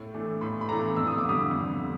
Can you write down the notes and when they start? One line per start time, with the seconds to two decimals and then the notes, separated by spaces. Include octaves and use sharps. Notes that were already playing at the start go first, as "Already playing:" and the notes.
Already playing: A2
0.14 E3 A3 D4
0.41 A2 B5
0.61 B5
0.69 E3 A3 D4 A#5
0.96 F2 E6
1.07 D#6
1.18 D6
1.25 D3 G3 D#6
1.51 F2
1.80 D3